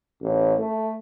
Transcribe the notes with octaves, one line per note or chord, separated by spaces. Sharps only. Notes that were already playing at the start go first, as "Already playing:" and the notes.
A1
A3